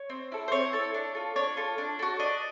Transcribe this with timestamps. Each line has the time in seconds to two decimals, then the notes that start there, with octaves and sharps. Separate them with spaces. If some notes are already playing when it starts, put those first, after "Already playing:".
Already playing: C#5
0.10 C4
0.32 E4 A4
0.48 C5
0.52 C4 C#5
0.73 E4 A4
0.94 D4
1.15 F4 A4
1.36 D4 C#5
1.57 F4 A4
1.78 D4
1.99 F#4 A4
2.19 D4 D#5